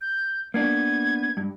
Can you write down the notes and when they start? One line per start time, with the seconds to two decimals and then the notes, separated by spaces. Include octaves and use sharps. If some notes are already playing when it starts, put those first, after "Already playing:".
0.01 G6
0.54 A#3 B3 D4 G#6
1.37 G2